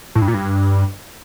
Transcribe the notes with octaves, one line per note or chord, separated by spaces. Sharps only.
A2
G2
A#2
G2